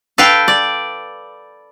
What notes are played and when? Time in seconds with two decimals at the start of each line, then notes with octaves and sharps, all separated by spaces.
0.18 A4 B4 F5 G5
0.48 D5